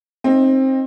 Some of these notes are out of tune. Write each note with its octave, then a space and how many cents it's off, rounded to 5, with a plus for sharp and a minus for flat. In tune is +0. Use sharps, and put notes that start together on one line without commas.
C4 +20 D#4 +0